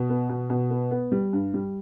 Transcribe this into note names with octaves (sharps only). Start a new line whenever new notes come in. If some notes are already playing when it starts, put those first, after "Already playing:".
Already playing: B2
B3
B2
B2
B3
B3
G3
G2
G3